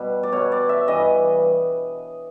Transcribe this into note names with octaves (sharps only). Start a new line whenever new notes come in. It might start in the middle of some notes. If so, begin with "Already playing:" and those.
Already playing: B2 G3
D5
B2 G3 C#5
D5
E5
G2 E3 G3 D#5